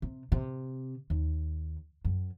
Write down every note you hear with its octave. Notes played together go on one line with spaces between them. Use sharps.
C3
C3
D#2
F#2